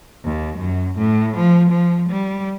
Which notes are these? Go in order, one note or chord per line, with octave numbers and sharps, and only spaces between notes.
D#2
F#2
A2
F3
F3
G3